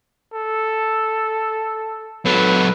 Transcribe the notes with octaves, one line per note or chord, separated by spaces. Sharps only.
A4
F#3 A4 B4